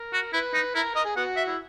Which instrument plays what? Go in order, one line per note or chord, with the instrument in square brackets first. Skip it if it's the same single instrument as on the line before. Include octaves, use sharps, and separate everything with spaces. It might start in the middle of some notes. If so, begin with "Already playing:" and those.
Already playing: [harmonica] A#4
[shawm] F#4
[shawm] E4 [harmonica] B4
[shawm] D#4
[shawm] E4 [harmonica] A#4
[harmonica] A#4 [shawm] D#5
[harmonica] G#4
[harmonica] B3 F#4 [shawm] F#5
[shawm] E5
[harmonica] E4